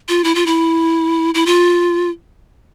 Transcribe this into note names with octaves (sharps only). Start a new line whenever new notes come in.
F4
E4
F4
E4
E4
F4